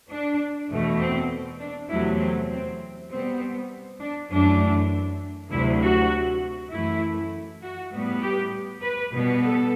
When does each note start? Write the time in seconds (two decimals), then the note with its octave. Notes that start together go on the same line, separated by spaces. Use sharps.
0.10 D4
0.70 E2 B2 A3
1.00 C4
1.60 D4
1.90 E2 C3 F#3 A3 E4
2.21 C4
2.50 C4
3.10 B2 G3 B3 C4
4.01 D4
4.31 F#2 E3 A3 D4
5.51 D2 C3 F#3 E4
5.81 F#4
6.71 F#2 E3 A3 E4
7.62 F#4
7.92 A2 G3 B3
8.22 G4
8.82 B4
9.13 B2 G3 B3
9.42 A4